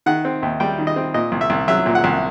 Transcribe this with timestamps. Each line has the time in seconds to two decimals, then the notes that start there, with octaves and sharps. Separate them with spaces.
0.06 D#3 F#5
0.25 C4
0.43 D#2
0.60 G3 G5
0.78 D#3
0.87 D#5
0.96 C4
1.14 A#2 D#5
1.32 C2
1.41 E5
1.50 C2
1.68 F#3 E5
1.86 A#2
1.95 F#5
2.04 C2